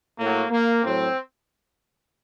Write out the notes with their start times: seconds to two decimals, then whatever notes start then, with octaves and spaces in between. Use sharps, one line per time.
0.19 A2 F#3 A#3
0.51 A#3
0.84 A2 F#3 C4